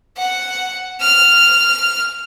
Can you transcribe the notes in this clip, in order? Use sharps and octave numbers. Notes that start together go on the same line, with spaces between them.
F#5
F6